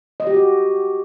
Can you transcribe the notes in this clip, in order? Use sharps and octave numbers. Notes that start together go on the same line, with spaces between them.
D#5
G4
F#4